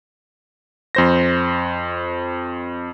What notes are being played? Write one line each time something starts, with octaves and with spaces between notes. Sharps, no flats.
F2 C5 A#6